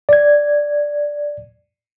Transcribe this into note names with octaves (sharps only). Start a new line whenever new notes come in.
D5 G#6